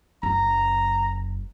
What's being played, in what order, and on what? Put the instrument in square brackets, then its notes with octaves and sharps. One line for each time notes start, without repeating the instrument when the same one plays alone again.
[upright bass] F#1 F#2 [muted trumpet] A#5